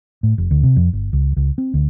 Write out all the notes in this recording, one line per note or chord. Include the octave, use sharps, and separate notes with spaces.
A2
F1
D2
C3
F2
G1
C#2
C#2
C4
D2